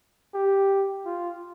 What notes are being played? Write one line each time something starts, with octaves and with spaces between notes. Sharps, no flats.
G4
F4